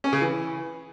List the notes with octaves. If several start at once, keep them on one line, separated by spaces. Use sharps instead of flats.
C#4
C#3
E3